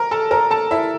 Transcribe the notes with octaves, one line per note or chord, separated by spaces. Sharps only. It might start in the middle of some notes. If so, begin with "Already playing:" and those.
Already playing: A#4 A#5
A4 A5
A#4 A#5
A4 A5
E4 E5